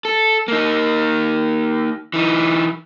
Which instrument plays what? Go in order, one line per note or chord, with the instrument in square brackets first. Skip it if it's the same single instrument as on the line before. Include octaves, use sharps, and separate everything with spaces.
[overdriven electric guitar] A4
A#3 D#4
E3 D#4